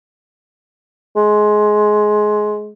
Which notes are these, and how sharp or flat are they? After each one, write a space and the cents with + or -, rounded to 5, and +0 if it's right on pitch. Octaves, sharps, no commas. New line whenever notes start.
G#3 +20